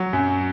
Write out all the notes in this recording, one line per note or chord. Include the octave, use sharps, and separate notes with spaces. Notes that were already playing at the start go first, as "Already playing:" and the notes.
Already playing: F#3
F#2